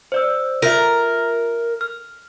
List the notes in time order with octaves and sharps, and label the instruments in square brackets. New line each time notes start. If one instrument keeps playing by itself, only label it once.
[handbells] C5 D5 E6
[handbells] F4 E5 [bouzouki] A#4
[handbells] F6